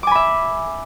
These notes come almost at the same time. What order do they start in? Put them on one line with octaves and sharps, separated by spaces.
D6 G#5 B5 E5